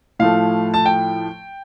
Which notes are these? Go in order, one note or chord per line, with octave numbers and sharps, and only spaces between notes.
A2 F3 A3 F5
A5
G5